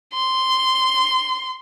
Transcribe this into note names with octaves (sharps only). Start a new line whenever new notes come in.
C6